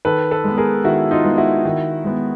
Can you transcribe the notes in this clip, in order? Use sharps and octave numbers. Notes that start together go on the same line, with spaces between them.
D#3 A4 B4
A4 B4
G#3 B3
G#4 A#4
D#3 E4 F#4
D#4 F4
G#3 B3
E4 F#4
D#3
G#3 B3